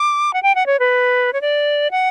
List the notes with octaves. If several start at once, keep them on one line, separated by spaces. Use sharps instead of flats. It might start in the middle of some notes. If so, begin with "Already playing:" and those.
Already playing: D6
F#5
G5
F#5
C#5
B4
C#5
D5
F#5